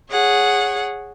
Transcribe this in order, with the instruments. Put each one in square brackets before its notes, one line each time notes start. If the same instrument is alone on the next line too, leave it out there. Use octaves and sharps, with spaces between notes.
[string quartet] G#4 C#5 F#5